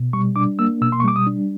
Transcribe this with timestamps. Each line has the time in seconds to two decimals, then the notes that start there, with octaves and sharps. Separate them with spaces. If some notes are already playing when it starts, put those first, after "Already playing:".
Already playing: B2
0.13 G3 C#6
0.36 D4 D6
0.59 A#3 E6
0.81 B2 E6
0.92 C6
1.00 C#6
1.04 G3 D6
1.16 D#6
1.27 D4